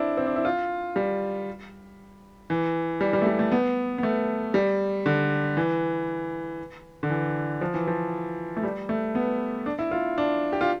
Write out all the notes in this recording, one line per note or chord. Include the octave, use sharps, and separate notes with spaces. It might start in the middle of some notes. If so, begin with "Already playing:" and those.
Already playing: C4 D4 E4
C4
D4
E4
F4
G3
E3
G3
G3
A3
G3
A3
B3
B3
A3
G3
D3
E3
D3
E3
F3
E3
F3
A3
G3
A3
B3
D4
E4
F4
D4
G4
F4